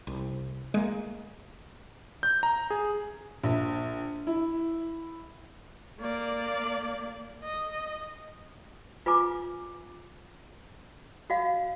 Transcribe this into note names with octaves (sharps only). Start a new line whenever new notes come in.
C2
G#3 A#3
G6
A#5
G#4
A#1
E4
A#3 D5
D#5
F4 B4 G#5 A#5 D6
F#4 D#5 F5